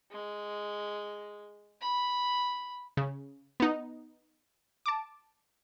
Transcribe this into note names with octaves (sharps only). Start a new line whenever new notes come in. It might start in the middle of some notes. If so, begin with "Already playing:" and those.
G#3
B5
C#3
B3 D#4
A5 D6